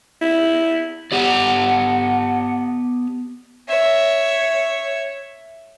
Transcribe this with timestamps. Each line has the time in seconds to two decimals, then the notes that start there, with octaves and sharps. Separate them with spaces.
0.21 E4
1.12 B3 G4 D5 F#5
3.68 C#5 E5